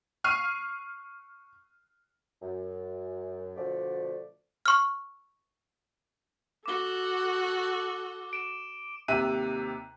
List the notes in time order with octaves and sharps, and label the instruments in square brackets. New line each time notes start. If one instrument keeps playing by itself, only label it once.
[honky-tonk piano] C#6 F6 C7 D#7
[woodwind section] F#2
B2 D3 F3 A3 D5
[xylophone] C#6 F6
[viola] F#4 A4 [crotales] D6 G7
[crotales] D7 E7
[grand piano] D#2 C3 E5 F#6 D#7